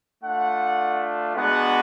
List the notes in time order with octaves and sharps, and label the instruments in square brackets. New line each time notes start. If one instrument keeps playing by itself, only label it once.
[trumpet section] A3 D4 F4 F#5
G#3 B3 D4 F#4 F#5